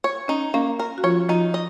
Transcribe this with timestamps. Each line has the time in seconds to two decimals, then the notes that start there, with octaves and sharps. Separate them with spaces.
0.04 C#5
0.28 C#4 D#4
0.54 A#3 C#4
0.80 A#4
0.98 F#4
1.03 F3 F4 C#5
1.29 F3 D#4 F4
1.54 D#5